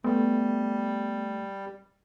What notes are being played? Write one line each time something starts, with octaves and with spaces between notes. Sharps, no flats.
G3 A3 B3